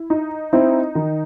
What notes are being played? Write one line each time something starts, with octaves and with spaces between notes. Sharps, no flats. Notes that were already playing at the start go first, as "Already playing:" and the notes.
Already playing: E4
D#4
C4 D#4 E4
D#3